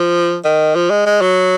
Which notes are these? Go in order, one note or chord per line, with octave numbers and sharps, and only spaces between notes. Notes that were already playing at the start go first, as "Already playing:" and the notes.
Already playing: F3
D#3
F3
G#3
G#3
F#3